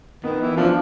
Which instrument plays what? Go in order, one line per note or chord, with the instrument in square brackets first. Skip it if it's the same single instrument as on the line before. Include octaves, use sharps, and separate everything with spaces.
[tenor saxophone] D#3 [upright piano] B3
[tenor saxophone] E3
[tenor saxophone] F3 [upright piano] D4